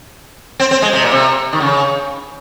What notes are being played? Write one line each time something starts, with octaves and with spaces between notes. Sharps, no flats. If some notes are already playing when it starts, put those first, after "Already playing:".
C4
C4
G#3
C3
A#2
C3
D#3
C#3